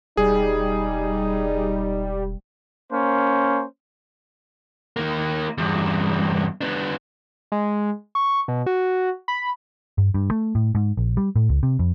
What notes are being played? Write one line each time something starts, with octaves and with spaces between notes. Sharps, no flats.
E1 G3 D#4 G#4
A#3 C#4 C5
D#3 A#3
E2 G2
B3 D4
G#3
C#6
B2
F#4
B5
G2
G2
A3
A2
G#2
A#1
G3
A2
C#2
C3
F2